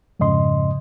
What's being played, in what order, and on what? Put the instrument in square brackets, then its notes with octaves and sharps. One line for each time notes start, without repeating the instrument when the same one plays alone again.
[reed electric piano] F2 G#2 C#3 D#5 C6